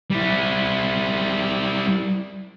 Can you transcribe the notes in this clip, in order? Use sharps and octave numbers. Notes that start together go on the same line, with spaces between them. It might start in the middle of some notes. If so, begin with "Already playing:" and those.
G3 E4